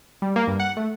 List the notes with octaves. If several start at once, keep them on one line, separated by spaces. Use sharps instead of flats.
G3
A#3
G2
F#5
A3